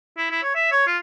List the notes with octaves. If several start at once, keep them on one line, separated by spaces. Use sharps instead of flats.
E4
E4
C#5
E5
C#5
F4